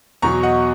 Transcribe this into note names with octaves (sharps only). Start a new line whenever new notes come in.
E2 B2 F#3 A#5 C#6
D#5 F#5